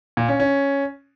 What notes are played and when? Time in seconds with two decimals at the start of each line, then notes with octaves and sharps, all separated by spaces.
0.17 A#2
0.28 C#4
0.40 C#4